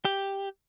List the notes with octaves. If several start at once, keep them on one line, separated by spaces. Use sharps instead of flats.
G4